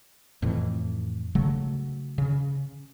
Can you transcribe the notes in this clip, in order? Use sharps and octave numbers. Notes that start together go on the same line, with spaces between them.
F2 A2 E3
C#3 F#3 A3
C#3